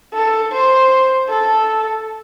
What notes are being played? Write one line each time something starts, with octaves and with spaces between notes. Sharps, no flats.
A4
C5
A4